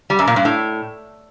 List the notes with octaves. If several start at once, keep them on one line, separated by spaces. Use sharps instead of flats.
G3
F#2
A#2
G2
A2